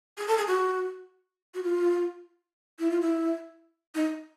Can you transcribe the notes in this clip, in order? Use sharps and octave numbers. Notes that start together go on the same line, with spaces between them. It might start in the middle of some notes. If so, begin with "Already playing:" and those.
G#4
A4
G#4
F#4
F#4
F4
E4
F4
E4
D#4